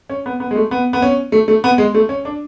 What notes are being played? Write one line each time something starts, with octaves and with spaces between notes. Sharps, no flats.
C#4
B3
B3
G#3
A3
B3
B3
C#4
A3
A3
B3
G#3
A3
C#4
D4